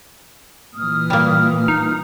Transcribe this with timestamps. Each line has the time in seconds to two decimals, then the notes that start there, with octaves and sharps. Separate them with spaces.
0.74 A#2 E3 D#6 F6
1.10 G3 A#3
1.68 D#4